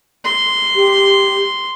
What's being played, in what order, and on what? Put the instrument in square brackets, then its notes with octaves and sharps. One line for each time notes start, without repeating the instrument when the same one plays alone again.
[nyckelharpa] C6
[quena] G4